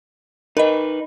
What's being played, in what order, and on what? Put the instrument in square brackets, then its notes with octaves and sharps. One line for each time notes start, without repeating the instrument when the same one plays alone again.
[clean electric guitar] D#4 B4 [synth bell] A#4 D#5